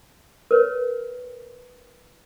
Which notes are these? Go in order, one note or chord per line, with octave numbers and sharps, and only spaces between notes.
A#4 B4 C#5